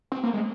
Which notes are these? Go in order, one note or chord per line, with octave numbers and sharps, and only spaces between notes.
C4
A#3
G#3